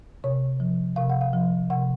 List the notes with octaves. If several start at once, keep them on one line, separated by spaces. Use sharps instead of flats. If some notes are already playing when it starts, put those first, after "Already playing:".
C3 C#5
F3
C3 F5
F#5
F5
F3
C3 F#5